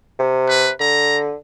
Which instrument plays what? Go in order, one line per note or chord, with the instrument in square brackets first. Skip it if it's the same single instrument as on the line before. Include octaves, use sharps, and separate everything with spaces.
[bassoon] C3
[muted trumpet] B4
[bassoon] D3 [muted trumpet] A#5